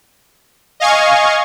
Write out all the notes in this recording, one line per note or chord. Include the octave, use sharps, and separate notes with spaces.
D#5 F5 G#5 C#6